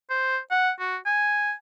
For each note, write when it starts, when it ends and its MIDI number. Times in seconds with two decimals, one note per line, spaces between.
0.10 0.38 72
0.51 0.71 78
0.79 0.96 66
1.06 1.52 80